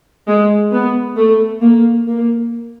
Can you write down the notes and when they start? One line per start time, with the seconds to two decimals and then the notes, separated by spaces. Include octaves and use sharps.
0.27 G#3
0.72 B3
1.17 A3
1.62 A#3
2.07 A#3